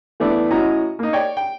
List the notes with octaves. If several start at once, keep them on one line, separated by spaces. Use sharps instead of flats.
E3 A3 B3 D4
A2 C#4 F#4 D#5 A#5
A#3 D#4
C#5 D5 G5
G5